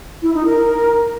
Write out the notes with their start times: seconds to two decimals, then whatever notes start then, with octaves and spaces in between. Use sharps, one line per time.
0.22 E4
0.34 D#4
0.46 A#4